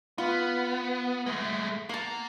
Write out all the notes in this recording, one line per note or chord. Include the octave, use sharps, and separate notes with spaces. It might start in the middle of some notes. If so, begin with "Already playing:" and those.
B3 F4
G#3 A3
A#3 A#4 F#5 A5